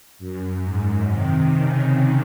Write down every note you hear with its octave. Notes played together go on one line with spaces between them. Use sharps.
F#2
G#2
C3 D#3
C#3